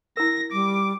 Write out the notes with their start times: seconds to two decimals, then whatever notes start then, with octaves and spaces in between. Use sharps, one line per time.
0.17 E4 A#4 A#6
0.52 G3 D6